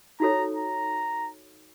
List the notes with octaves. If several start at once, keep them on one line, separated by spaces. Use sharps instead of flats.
D#4 F#4 A4 C#5 A#5
A#5